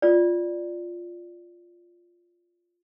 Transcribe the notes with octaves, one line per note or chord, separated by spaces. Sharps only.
F4 D5